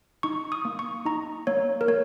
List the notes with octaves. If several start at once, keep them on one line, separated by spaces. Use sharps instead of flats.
D#4 C#6
D#6
A#3
C#6
D#4 A#5
A#3 C#5
A#4
A#3 C#5